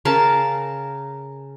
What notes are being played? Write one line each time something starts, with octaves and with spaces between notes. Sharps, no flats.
C#3 A#4 F5 A5